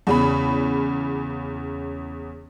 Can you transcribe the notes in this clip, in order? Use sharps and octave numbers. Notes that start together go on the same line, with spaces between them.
E2 C#3 B5